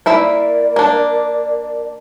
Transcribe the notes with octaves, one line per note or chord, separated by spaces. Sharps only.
A#3 E4 A#4 D5 E5
A#3 D4